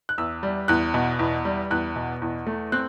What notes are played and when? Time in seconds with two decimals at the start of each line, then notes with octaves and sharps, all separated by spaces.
0.09 F#6
0.18 E2 E6
0.43 G3
0.68 E2 F#6
0.94 B2
1.19 E2
1.45 G3
1.71 E2 F#6
1.96 B2
2.22 E2
2.47 A3
2.72 C4 F#6